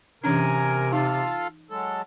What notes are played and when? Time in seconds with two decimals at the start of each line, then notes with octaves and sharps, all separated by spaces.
0.24 C3 E3 C#4 D4 A#4 G#5
0.92 D#4 F4 A4 F5
1.71 F#3 G#3 A4